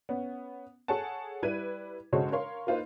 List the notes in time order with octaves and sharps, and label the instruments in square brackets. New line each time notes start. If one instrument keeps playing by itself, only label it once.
[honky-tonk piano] B3 C#4
G#4 A4 C#5 F#5 G#5 A5
G3 E4 B4 G#6 D#7
C#3 G#3 F#4 A4 C5 C#5
A#4 C#5 F5 C6
A#3 D#4 F4 B4 C5